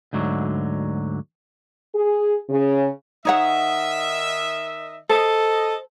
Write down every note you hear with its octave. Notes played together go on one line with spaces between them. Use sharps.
D2 G#2 D3 F#3
G#4
C#3
D#3 D#4 C#5 D#5 E5 F#5
A4 C5 D#5